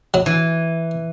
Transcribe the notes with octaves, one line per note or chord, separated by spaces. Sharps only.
F#3
E3